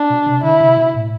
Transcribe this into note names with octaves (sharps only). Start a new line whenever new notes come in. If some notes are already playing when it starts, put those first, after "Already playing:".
Already playing: D4
B2
C3
D3 E4
C3
B2
A2